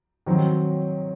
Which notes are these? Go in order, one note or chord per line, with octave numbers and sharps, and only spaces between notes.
D#3 F#3 C4